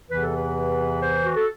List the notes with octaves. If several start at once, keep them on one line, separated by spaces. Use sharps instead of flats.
E2 C3 E3 B4
A4
B4
C5
F#4
A4